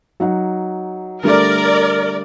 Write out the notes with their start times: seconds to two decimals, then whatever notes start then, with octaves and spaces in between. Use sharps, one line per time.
0.20 F#3 D#4 F#5
1.23 D3 G3 A3 A#4 D5